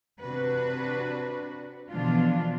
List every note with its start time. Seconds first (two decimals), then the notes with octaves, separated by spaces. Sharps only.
0.20 C3 C4 D4 F#4 B4
1.91 B2 D3 E3 F3 D4 F4